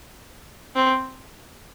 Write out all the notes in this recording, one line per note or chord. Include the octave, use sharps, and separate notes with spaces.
C4